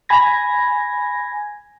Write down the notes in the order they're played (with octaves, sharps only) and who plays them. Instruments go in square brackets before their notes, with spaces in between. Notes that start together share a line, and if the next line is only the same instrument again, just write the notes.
[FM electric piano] G#5 B5 G#6 A#6